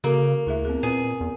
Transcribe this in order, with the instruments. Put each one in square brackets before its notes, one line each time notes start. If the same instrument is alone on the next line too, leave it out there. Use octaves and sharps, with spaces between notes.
[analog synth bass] C#3 [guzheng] A#3 [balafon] F#4 A4 F5
[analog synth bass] D2 [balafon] E4 G#4 E5
[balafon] B3 C4 G#4
[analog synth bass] A#2 [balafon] C4 B4 [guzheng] G#4
[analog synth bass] E2